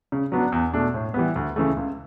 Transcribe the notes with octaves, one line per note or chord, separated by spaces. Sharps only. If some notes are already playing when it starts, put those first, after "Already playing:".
C#3
F#3 B3 D4
E2
B2 A3 D4
A2
E3 G3 B3
D2
C#3 E3 A3
C#2